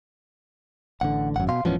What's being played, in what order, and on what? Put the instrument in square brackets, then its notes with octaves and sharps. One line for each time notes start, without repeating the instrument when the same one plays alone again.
[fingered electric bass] A1 D3 [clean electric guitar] F#5
[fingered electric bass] G#1 F#2 [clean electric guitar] F#5
[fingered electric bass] B2 [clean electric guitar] F5 C6
[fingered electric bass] D#1 E3 F3 [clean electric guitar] G#2 B3 C#4